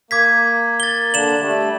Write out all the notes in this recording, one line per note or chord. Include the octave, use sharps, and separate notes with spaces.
A#3 D6 G#6 B6
A6 G7
D3 D4 E7 F#7
G3 A3